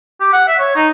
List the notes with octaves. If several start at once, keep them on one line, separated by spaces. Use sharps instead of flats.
G4
F#5
E5
C#5
D#4